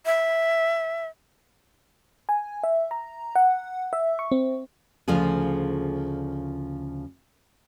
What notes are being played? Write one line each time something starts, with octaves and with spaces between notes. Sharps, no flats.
E5
G#5
E5
A#5
F#5
E5
C#6
C4
D2 C#3 F3 F4 G#4